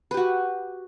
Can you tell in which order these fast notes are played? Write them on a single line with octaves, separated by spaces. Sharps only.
B4 G4 F#4